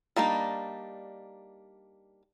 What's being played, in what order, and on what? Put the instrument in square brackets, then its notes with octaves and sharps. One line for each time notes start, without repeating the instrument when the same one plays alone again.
[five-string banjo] G3 A#3 D4 D#4